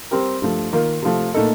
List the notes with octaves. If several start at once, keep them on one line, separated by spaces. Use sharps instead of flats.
G3 C4 G4 A#4
G2 F3 A3
D#3 A#3 F4 A#4
C3 F3 A3
A#2 A3 D#4 A4